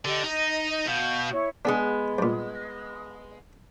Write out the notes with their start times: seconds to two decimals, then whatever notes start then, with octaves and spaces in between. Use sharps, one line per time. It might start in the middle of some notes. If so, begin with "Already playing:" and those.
0.05 D3 G4 D#5
0.23 D#4 D#5
0.87 B2 F5 G6
1.32 E4 C#5 C#6
1.65 G#3 B3 D4 G#4
2.18 G2 A#2